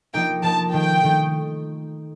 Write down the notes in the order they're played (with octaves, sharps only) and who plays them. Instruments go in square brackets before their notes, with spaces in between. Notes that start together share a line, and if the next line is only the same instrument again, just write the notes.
[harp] F3 A#3 D#4 A#4 [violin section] G5
[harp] F3 A#3 D#4 A#4 [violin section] A5
[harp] D#3 A3 D#4 [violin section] G5
[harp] D#3 A3 D#4